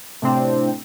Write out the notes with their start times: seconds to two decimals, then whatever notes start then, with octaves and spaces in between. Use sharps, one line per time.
0.22 A2 C3 C4 D4